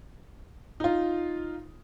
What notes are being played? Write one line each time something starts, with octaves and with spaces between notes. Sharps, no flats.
D#4 F4